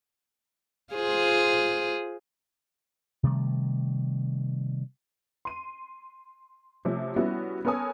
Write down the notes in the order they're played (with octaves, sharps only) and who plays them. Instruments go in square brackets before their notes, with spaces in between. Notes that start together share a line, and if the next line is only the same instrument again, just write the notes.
[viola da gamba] F4 G#4 C5
[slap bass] C3 D#3 G3 A3
[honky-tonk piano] C6 D#7
C3 F3 A3 C#4
G3 B3 C#4 E4 F#4
B3 A4 A#4 C#5 G#5 D#6